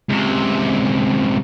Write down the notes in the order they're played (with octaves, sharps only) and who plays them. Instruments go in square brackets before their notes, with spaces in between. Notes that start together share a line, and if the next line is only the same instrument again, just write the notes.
[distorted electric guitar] C#2 C3